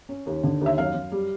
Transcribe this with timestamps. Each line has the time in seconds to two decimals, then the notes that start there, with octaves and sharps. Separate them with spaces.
0.09 C#4
0.26 D#2
0.43 D3
0.61 D#2 E5
0.78 F#2 F5
0.95 F#2
1.12 G3